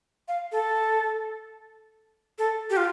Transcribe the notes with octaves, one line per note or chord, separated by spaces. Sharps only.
F5
A4
A4
G4
F4